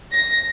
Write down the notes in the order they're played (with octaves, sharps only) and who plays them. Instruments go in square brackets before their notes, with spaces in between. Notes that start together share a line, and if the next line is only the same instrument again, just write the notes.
[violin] A#6